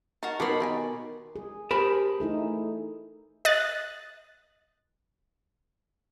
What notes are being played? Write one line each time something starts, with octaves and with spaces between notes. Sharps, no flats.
D#4 F#4 A#4 A5
B2 D#3 A4 C#5 D5 B5 C6
D#4 A#4 G#5
G#4
G4 G#4 A#4 C5 A5 B5
A3 D#4 E4 G#4
D#5 F#6 A6